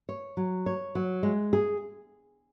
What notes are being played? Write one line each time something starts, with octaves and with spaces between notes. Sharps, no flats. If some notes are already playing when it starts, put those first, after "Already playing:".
C#5
F#3
C#5
F#3
G#3
G#4